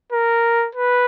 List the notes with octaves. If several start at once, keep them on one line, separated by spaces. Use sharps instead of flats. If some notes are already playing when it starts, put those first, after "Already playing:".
A#4
B4